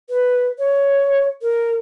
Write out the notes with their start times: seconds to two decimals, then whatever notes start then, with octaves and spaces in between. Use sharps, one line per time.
0.09 B4
0.59 C#5
1.42 A#4